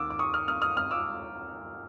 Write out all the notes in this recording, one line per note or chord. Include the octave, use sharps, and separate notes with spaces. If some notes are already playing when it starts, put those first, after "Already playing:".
Already playing: D#2 D6 E6 F6
D6
C#6 D#6
D#6 F6
D#6 F6
D#6 F6
D#6 F6
D6 E6